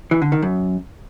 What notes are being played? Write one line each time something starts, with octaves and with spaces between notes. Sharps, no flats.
E3
D3
D#3
F#2